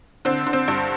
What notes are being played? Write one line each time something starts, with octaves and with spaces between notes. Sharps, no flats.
D3 C4
D3
C4
G2